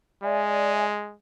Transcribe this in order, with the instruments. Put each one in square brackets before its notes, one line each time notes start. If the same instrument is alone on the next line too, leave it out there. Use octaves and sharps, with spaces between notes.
[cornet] G#3 [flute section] D5 E5 G#5